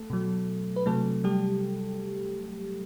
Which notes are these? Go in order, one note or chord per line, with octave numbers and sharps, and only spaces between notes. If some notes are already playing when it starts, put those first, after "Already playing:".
Already playing: A3 A4
B2 F#3
B4
C3 F#3 A3 A4
G3 G4